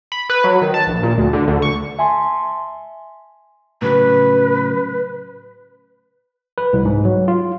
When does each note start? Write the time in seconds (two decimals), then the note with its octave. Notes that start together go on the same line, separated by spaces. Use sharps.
0.12 B5
0.30 B4
0.44 F#3
0.61 D#3
0.74 A5
0.87 A#1
1.03 A#2
1.18 D2
1.33 D3
1.47 D2
1.62 C#6
1.99 E5 G#5 A5 C6
3.82 A2 C#3 F#3 B4
6.58 B4
6.73 C2
6.85 G#2
7.05 F#3
7.28 F4